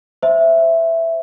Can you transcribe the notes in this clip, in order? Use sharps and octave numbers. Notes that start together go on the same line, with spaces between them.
C5 E5